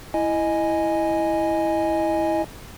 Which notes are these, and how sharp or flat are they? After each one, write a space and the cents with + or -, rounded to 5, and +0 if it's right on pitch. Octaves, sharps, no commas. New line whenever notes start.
E4 +0 D#5 +0 G#5 +0